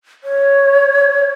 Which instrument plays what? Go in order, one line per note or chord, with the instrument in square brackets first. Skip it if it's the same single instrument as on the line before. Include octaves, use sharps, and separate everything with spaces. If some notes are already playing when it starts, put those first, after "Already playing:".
[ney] C#5